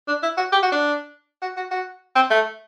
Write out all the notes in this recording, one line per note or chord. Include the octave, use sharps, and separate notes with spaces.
D4
E4
F#4
G4
F#4
D4
F#4
F#4
F#4
C4
A3